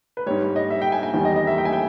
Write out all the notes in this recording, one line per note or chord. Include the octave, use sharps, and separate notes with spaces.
B4
G#2 G3 C#5
C#5
D#5
E5
G5
G#5
G#5
E2 D#3 G3
D#5
D#5
E5
G5
G#5
G5